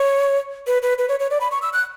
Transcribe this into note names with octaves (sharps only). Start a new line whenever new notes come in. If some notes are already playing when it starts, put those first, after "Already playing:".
Already playing: C#5
B4
B4
B4
C#5
C#5
D5
B5
C#6
E6
F#6